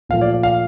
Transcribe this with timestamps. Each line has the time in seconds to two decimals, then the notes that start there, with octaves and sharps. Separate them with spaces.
0.09 A#2 F3 A3 F5
0.21 D5
0.33 D5
0.43 F5